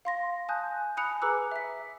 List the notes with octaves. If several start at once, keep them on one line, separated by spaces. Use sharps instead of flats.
F5 C6 A#6
G#5 A5 D#6 F#6 G6
G#5 B5 D#6 F#6 C#7 F7
G#4 B4 A#5 D6 E6 F#6
E5 B6
E5